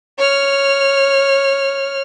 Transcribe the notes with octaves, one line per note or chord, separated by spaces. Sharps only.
C#5 F6